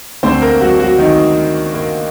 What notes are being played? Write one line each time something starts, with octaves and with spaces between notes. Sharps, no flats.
D2 D3 A3 C4 C5
A#3 A#4
F#3 F#4
F#3 F#4
D#3 D#4
A#3